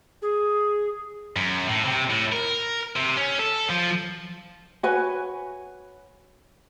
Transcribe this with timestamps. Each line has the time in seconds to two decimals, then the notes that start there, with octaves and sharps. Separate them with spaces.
0.22 G#4
1.36 F#2
1.67 A2
1.85 C3
2.10 A2
2.32 A#4
2.96 C3
3.17 C#4
3.39 A4
3.70 F3
4.83 F#4 B4 C#5 G#5